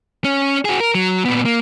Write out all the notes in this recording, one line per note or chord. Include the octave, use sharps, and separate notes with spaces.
C#4
F#4 G#4
A#4
F#3
A#2 B3
A#3